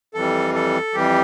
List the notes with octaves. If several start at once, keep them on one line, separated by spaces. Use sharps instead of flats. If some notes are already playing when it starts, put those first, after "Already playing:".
F2 E3 G3 A4
A4
F2 E3 G3 G4